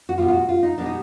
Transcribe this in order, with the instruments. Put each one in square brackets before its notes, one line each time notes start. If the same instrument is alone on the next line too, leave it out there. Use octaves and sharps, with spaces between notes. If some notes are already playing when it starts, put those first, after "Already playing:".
[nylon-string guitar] F#4
B2 G3 B3 F4
F4
F#4
F4
D#4
B2 G3 B3 D4
D#4